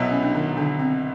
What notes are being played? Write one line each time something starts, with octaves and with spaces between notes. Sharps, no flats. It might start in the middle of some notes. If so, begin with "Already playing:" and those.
Already playing: C2 B2 F#3 B3 E4
C#4
D4
D#3 D#4
D3 D4
C4